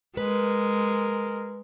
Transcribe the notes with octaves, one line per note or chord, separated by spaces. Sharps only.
G#3 A#4 B4